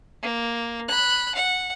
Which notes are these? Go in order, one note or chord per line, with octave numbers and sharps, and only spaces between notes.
A#3
B5 F#6
F#5